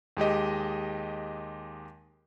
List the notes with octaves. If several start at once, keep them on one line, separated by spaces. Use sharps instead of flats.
D#2 G#3 G4 D#5